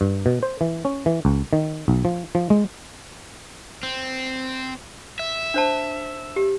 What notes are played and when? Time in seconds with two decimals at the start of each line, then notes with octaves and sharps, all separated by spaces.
0.01 G2
0.26 B2
0.43 C5
0.61 E3
0.85 C#4
1.06 E3
1.25 C#2
1.53 D#3
1.88 B1
2.05 F3
2.35 F3
2.50 G#3
3.83 C4
5.19 E5
5.54 D4 C5 A5
6.36 G4